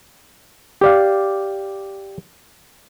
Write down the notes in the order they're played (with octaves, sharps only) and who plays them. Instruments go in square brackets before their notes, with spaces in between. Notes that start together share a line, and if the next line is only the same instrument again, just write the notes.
[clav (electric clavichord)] G4 D5 F5